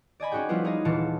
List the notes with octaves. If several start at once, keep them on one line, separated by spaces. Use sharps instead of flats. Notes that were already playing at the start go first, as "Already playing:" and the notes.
D5 D#5 G#5 B5
C#4 D#4 F#4 G#4 G5
F3 G3 B3 E4 F4 B4
B3 D#4 F4 G#4 D#5
D#1 E3 F4 A5 C#7